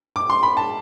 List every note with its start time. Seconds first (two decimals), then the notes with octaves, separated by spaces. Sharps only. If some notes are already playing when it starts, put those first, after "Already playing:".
0.16 D6
0.30 C6
0.43 B5
0.57 A5